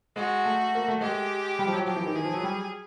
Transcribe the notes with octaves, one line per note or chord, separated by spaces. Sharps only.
G#3 F#4
A3
A#3
A3
G#3 G4
G3
F3
F#3
F3 G4
E3
D#3
E3 G#4
F3
F#3
G3